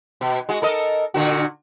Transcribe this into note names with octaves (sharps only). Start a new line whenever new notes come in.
B2
G#3 F#4
A4 A#4 D#5
A#2 D3 F#4